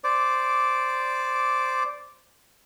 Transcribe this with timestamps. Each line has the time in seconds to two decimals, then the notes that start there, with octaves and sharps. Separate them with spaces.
0.04 C5 D5 D6